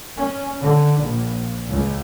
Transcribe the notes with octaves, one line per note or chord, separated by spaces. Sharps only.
C#4
D3
A#1
C#2